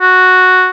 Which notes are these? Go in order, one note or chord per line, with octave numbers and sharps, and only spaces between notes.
F#4